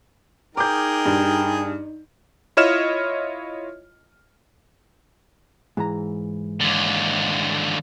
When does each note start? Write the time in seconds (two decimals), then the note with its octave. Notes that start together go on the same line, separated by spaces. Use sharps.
0.57 D#4 G#4 A#4 G5 D6 G6
1.06 G2
2.57 E4 F4 C#5 D#5 F6 E7
5.77 G#2 E3 A#5
6.61 D#2 D3